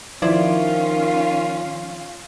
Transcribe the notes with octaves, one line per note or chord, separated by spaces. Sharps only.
D#3 F3 C#4 E4 F4 C5 D5